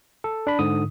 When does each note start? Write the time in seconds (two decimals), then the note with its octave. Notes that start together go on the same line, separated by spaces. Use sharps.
0.24 A4
0.47 D4 B5
0.59 G#2 D3 D#6